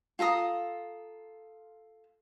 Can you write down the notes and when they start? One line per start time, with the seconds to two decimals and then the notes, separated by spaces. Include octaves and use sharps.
0.19 F4 A4 A#5 D#6